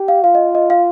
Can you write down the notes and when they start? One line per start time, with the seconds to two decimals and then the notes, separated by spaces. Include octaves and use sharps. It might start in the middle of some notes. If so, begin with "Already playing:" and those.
Already playing: G4
0.08 F5
0.23 F4 F5
0.35 D#5
0.55 D#5
0.70 F5